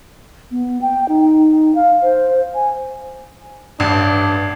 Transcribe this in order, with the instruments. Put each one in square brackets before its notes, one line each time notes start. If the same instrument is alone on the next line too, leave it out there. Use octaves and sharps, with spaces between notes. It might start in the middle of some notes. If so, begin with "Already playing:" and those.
[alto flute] B3
G5
D#4
F5
C5
G#5
[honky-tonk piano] A1 [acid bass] G2 [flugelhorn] D4